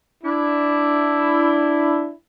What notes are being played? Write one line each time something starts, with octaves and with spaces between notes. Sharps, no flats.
D4 E4